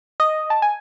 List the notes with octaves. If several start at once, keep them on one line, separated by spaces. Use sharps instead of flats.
D#5
A5
G#5